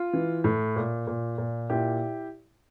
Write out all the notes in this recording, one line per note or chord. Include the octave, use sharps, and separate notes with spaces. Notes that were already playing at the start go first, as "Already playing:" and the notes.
Already playing: F4
E3
A2
A#2
A#2
A#2
A#2 E4 G4